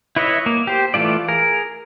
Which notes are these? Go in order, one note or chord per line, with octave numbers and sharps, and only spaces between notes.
E4 B4 C#5 D#5 E5
A#3
G4 C5
E3 A3 F4 D5
G#4 A#4